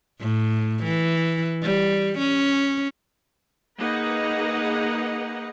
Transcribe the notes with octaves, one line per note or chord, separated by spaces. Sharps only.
A2
E3
G3
C#4
A#3 D#4 G#4 B4 D#5 F#5